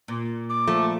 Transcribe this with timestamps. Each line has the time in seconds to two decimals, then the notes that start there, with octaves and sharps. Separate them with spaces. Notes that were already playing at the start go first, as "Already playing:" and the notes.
0.08 A#2
0.49 D6
0.68 F3 A3